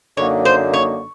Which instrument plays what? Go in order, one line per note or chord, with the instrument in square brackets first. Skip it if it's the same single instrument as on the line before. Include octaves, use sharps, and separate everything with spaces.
[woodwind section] F#2 D3 F#3 A#3 D#4 [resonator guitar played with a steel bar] C#5
[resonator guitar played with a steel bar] C5
C#5